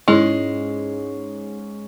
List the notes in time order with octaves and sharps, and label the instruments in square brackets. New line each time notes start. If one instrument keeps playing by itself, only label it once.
[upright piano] G#2 C#4 [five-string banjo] G#3 [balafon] E4 G#4